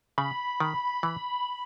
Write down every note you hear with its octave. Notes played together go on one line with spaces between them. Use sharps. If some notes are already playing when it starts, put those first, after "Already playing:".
C#3 B5
D#3
E3